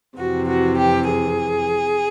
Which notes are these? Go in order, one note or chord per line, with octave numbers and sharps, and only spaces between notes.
F2 C3 E3 F#4
F#4
G4
G#4